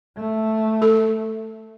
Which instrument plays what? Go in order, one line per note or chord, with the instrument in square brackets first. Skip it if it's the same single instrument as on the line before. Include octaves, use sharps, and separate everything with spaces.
[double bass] A3
[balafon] A4